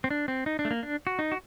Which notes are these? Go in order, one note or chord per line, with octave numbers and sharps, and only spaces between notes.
C4
D4
C4
D#4
D4
A3
A#3
D4
F#4
D#4
F#4